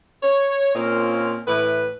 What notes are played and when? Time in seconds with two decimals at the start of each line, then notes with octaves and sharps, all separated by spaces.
0.23 C#5
0.75 A#2 C4 C#4 F4 A#4 D#5
1.48 A2 E3 E4 B4